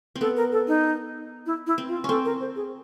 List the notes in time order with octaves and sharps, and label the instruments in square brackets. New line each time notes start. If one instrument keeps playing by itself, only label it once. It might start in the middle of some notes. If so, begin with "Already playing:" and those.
[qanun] C4
[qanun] B3 [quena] A4
[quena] A#4
A4
D#4
E4
E4
[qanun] C4
[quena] F4
[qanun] C4 C#4 [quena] A4
[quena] A#4
C5
G#4